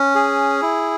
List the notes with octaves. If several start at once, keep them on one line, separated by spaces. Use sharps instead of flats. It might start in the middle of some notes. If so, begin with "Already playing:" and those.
Already playing: C#4
G#4
E4